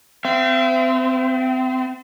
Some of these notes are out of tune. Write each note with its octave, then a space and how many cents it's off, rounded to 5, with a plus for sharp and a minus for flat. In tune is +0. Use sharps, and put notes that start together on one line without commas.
C4 -30 E5 +40